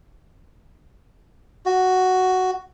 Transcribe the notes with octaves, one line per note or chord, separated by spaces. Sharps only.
F#4